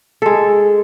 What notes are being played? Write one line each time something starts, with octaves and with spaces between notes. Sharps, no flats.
G#3 A4